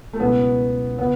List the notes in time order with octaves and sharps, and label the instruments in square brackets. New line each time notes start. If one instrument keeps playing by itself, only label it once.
[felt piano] A3
[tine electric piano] C#2 B2 F#3 C#4 E4 [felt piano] B3
[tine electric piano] C#3 [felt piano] B3